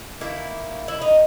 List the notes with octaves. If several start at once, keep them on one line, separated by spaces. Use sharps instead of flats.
D#3 A#3 E4
E4
D#4